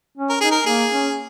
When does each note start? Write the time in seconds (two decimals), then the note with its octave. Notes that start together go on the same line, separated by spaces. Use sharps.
0.18 C#4
0.29 A#4
0.41 D#4 G#4
0.51 A#4
0.66 A#3 G#4
0.91 C#4